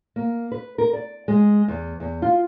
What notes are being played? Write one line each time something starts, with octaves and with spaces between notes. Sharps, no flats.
A#3
B4
A#4
D5
G#3
E2
E2
F4